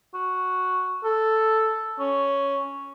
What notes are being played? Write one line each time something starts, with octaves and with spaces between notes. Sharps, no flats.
F#4
A4
C#4